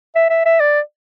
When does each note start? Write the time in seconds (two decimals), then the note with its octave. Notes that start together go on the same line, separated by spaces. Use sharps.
0.15 E5
0.30 E5
0.46 E5
0.60 D5